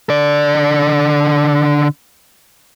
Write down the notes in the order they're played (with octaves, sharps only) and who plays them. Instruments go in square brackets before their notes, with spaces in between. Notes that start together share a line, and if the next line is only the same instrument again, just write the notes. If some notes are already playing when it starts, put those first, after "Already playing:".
[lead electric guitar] D3 D5